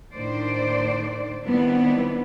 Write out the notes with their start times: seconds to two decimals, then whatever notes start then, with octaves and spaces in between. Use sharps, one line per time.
0.14 A2 D#3 D4 C5 D5
1.43 D#3 G3 B3 C4 D4 E4